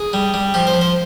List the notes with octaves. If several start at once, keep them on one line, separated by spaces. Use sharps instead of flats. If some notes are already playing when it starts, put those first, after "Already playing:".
Already playing: G#4
G3
G3
F3 G4
C5
F3
C5